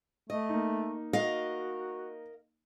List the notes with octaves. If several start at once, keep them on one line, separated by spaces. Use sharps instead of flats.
A3 D#5
A#3 D#4
F#4 A#4 D#5 F5